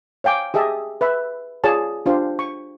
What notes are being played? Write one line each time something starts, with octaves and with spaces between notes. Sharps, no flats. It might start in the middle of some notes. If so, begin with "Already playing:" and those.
C#5 F5 G5 G#5 D6
G4 G#4 D#5 E5 A5
B4 E5 B5
F4 G#4 C#5 D5 A5
D4 F4 G4 C5
C#6